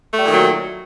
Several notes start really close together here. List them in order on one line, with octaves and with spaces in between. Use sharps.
A3 G3 A#2 D#3 F#3